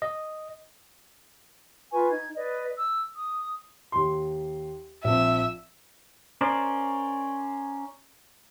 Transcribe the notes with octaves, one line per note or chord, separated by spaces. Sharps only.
D#5
F4 B4 G#5 C#6
D#4 G#6
B4 D5 D#5
E6
D#6
D#2 C6
A#1 C4 E5
C#4 A#4 C5 D5